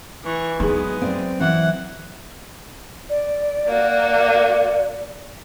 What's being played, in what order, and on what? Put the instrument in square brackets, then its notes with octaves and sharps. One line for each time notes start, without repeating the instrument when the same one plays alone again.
[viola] E3 C#6
[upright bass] F#3 [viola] G#3 B3 [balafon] D#4 G#4
[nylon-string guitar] C4 D5
[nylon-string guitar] E3 C4 [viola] F#5
[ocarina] D5
[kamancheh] A#3 F#4